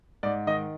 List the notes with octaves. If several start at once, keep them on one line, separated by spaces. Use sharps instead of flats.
G#2 D5
D#3 D#5